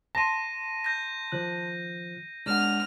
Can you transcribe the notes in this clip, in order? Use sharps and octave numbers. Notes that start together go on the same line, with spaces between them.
A5 C6 A#6 D#7
G6 A#6
D#3 F3 F#6
G#3 D4 F#5 F6